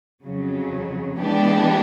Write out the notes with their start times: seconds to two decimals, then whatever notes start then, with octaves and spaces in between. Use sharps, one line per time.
0.24 F2 C#3 F#3
1.19 E3 G#3 B3 D4 G4